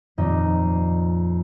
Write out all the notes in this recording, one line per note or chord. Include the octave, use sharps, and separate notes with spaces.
D#1 F2 D#4